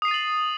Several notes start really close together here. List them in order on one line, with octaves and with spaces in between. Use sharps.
D#6 C7 D#7 A6 F#7